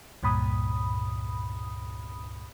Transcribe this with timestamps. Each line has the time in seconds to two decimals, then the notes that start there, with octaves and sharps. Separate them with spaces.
0.23 C#2 G2 A#2 B5 D#6